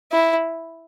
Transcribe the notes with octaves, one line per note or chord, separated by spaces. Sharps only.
E4